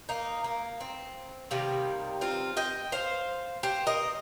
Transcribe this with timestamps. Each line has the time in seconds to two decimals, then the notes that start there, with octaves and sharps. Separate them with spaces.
0.09 A#3 D#4
0.44 A#3
0.80 C4
1.51 C3 D#3 G3 A#3
2.21 C4 F4
2.57 D#5 G5
2.92 C5 F5
3.63 G4 C5
3.87 A#4 D#5